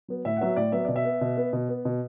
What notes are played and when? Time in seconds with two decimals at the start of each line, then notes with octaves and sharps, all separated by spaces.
0.08 F#3 B3
0.25 A2 E5
0.36 F#5
0.41 F#3 B3 E5
0.56 A2 D5
0.72 F#3 B3 E5
0.85 B2 D5
0.96 E5
1.05 B3
1.21 B2
1.37 B3
1.53 B2
1.69 B3
1.85 B2